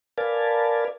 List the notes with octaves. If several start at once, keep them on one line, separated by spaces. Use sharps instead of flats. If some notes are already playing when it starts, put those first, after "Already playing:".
A#4 B4 D5 F5 G#5 A5